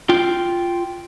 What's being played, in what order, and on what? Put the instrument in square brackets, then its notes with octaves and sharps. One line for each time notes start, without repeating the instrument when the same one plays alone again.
[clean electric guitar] F4 G5